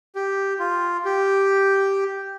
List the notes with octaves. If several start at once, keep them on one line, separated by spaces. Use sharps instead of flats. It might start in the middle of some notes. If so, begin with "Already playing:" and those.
G4
F4
G4